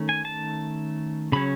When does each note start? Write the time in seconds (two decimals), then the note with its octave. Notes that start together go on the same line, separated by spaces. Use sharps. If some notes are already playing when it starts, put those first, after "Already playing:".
Already playing: D#3 A3 C#4
0.09 G#5
0.25 A5
1.32 C#3 F#3 C#4 B5